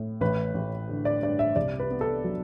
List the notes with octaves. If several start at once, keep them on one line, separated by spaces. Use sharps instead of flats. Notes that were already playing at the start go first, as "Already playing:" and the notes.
Already playing: A2
A1 B4
A1
D3
D5
G2 D5
E5
C2 D5
B4
B3
A4
F#3